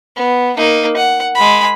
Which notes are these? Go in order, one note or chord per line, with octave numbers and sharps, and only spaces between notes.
B3
A#3 D#4
F#5
G#3 B5